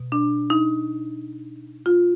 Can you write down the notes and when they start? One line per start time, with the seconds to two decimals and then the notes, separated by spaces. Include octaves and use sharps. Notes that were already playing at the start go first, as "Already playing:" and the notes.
Already playing: B2
0.12 D4
0.50 D#4
1.86 F4